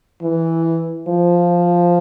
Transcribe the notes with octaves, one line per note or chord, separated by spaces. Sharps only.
E3
F3